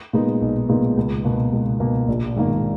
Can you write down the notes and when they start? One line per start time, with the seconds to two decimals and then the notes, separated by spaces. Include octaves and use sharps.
0.13 A#2 G#3 B3 D#4
0.41 B1
0.69 A#2 G#3 B3 D#4
0.97 C#2
1.25 B2 A#3
1.52 C#2
1.80 B2 A#3
2.08 A#1
2.36 G#2 D#3 A#3